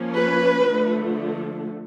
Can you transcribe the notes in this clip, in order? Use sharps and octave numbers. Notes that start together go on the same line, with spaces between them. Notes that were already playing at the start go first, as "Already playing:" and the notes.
Already playing: F3 A#3 C#4
B4
D3 F3 A3